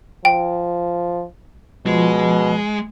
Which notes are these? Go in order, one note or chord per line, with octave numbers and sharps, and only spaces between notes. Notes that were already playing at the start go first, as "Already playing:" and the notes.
F3 G5
B2 F3 G#3